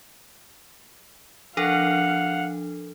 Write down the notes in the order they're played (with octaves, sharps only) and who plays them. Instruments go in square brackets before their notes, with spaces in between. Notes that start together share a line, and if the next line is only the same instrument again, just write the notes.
[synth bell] F3 D4 A4 [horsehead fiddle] F5 F#5